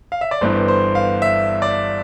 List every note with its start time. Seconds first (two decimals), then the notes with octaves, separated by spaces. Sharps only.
0.12 F5
0.21 E5
0.31 D5
0.41 G1 G2 E3 B3 C5
0.68 C5
0.95 F5
1.22 E5
1.62 D5